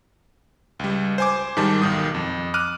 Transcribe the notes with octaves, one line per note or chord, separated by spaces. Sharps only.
C#2 G3
C5 G#5 D6
G#2 D#3 G3 A5
B1 D#3 D#6
F2
D6 F6 F#6 D#7